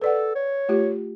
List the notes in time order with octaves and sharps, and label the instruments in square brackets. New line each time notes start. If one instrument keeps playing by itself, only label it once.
[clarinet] A4 [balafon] B4 D5 F#5
[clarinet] C#5
[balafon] A3 F4 G4